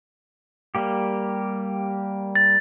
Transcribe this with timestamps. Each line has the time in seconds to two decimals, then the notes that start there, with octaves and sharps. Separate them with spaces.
0.75 G3 A#3 G4
2.35 A6